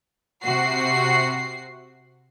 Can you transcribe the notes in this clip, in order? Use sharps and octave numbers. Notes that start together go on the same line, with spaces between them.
C3 F#4 C7